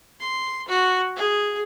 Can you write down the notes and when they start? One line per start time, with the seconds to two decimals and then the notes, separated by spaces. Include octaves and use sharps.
0.20 C6
0.68 F#4
1.16 G#4